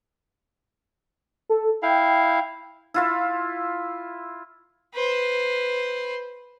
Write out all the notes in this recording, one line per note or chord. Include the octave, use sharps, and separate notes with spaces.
A4
E4 F5 G5
E4 F4 E5
B4 C5